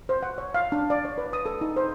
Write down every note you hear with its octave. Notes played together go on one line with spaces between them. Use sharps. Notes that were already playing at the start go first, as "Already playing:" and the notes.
C5
F#5
C#5
F5
D4
D5
C#5
B4
D#6
A4
D#4
C5